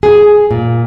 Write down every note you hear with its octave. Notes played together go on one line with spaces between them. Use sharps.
G#4
A#2